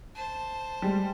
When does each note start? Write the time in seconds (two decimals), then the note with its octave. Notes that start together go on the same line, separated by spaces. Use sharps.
0.15 C5 A5
0.82 G3 G#3